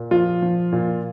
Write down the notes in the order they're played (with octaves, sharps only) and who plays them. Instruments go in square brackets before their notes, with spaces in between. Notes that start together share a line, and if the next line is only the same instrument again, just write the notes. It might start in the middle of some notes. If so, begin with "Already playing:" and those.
Already playing: [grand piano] A#2 A#3
F3 F4
F3
A#2